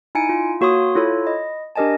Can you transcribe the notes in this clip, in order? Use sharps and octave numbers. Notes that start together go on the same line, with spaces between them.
D#4 E4 G#5 C#7 D7
E4 F4
A#3 F#4 C#5 C6 D#6
E4 F4 A4 C#5
D#5 B5
D4 G4 A#4 D#5 G#5 A5